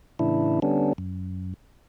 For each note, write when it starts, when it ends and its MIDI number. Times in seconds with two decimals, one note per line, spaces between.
0.19 0.60 45
0.19 0.60 49
0.19 0.60 52
0.19 0.60 62
0.19 0.60 64
0.62 0.93 50
0.62 0.93 55
0.62 0.93 59
0.62 0.93 61
0.62 0.93 62
0.98 1.54 42